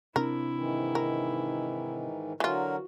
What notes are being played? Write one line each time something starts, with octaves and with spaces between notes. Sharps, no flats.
C3 C4 D4 E4 A#4
G#2 D#3 E3
A#4
D3 E3 F#3 F4 F#4 A#4